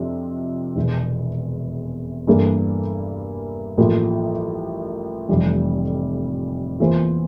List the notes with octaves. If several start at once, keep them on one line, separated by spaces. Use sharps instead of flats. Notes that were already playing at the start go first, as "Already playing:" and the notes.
Already playing: F2 C3 F3 D4
E1 E2 E3
G2 E3 A#3 D4 A4
A1 A2 F3 A#3
F1 F2 E3 G3
E2 E3 A#3 F4 C5